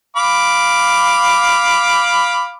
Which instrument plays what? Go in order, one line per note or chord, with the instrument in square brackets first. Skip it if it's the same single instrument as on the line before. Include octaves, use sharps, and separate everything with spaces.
[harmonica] F5 B5 D6